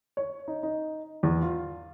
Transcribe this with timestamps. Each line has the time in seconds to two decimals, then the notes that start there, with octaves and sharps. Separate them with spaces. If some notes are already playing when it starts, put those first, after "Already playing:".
0.17 C#5
0.48 D#4
0.63 D#4
1.23 E2
1.42 F4